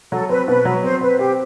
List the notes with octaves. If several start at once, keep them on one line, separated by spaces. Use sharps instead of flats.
F#3 A4
C4 B4
B2 B4
F#3
C4 C5
C4 B4
C4 G4